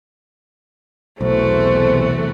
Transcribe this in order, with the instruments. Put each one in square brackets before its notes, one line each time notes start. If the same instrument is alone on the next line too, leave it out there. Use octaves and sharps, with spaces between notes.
[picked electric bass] B1 [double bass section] E2 C3 E3 [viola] A3 F#4 [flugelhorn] C5